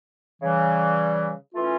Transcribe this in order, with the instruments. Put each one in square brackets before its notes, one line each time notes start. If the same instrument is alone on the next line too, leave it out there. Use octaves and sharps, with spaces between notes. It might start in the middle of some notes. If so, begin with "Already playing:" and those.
[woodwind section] C#3 E3 G3
E3 A3 C#4 F4